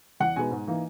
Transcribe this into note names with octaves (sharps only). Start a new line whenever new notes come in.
E2 F#5
B2 G#3 B3 D#4 G#5
G#2
E3 A#3 D#4